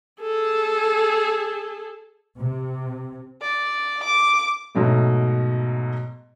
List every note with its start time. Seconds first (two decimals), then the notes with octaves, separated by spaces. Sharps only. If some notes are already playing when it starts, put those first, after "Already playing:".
0.21 G#4 A4
2.38 C3
3.41 D5
4.03 D6
4.75 G#2 B2 F#3 A3